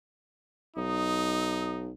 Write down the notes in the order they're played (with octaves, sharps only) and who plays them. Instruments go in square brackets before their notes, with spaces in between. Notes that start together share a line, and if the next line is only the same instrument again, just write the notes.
[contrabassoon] B1 [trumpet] D#4 [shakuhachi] D#6